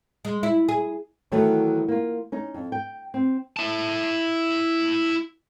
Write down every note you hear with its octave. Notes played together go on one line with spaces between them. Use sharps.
G#3
E4
G#4
D#3 E3 F#3 A3 B3
A#3 F4
C#4 D#4
F2
G5
C4
E4 A5